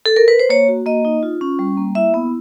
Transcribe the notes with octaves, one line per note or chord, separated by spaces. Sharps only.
A4
A#4
B4
C5
A#3 C#5
F#4
A#3 D#5
D#4
F4
C#4
G3
A#3
E4 E5
B3